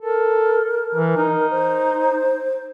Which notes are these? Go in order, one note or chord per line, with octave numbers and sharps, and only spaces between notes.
A4 A#4
E3
D#4
C5